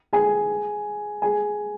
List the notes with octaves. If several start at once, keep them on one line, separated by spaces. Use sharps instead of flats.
G#4 G#5
G#4 G#5